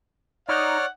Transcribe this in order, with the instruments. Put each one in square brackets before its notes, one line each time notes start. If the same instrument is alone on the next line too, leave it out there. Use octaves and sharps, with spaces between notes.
[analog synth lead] D#4 [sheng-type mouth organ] C#5 D5 F6 [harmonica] F#5